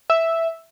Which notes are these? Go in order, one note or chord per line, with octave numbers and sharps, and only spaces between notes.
E5